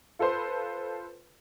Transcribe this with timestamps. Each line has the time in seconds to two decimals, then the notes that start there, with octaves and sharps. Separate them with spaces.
0.19 F4 A4 B4 C5 C6